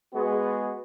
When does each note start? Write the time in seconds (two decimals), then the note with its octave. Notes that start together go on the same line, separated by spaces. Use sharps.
0.13 G#3 B3 F#4 G#4